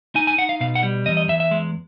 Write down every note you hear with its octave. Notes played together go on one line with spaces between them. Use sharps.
D#4 G#5
G#5
D#4 F#5
F5
B2 F5
F#5
G3
E2 D#5
D#5
E2 E5
E5
G#3